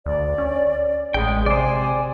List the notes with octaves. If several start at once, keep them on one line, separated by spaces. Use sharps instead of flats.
D2 D5
C#4
A1 G#3 G#4 G5
C3 C5 D5 G#5